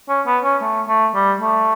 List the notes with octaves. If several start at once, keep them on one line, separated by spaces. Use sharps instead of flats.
C#4
B3
C#4
A3
A3
G3
A3